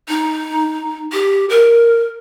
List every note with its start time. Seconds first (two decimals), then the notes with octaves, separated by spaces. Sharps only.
0.08 D#4
1.13 G4
1.50 A#4